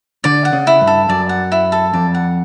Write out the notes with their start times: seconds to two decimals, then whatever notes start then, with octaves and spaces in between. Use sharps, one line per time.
0.24 D3 D5
0.45 F#5
0.53 C#3
0.67 E4
0.81 G2
0.87 A4
1.09 F#2 D5
1.29 F#5
1.52 E4
1.72 A4
1.93 F2 D5
2.14 F#5